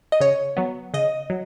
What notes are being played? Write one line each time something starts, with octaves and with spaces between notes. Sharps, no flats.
D#5
C#3 C#5
F#3 B3
C#3 D#5
F#3